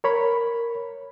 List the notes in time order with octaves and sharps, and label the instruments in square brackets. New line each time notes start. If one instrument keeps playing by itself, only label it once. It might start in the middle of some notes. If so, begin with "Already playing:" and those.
[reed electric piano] A#4 C#5 B5